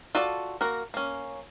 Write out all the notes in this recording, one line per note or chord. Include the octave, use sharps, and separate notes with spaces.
F4 F#4 A4 D5
A#3 F#4 A#4
A#3 C#4